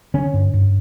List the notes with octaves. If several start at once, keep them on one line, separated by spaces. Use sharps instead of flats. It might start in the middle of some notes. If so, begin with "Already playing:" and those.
D3 C#4
G2
G2